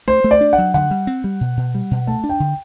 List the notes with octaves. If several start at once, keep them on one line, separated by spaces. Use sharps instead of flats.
A3 C5
A3
D5
D4
F#5
F#3
D3 F#5
G3
C4
G3
B2
B2
G3
B2
A3 A5
D4
G5
D3